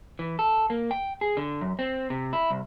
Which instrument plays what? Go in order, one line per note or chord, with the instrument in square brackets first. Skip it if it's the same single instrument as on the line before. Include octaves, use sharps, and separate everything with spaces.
[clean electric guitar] E3
A4
A#3
G5
G#4
D3
F#2
C4
C3
E4
C2